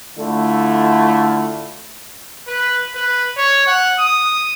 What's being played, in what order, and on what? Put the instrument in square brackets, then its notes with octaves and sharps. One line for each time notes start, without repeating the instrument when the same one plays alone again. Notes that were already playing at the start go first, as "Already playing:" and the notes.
[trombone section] D3 A3 E4 F4
[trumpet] B4
B4
C#5
F#5
D#6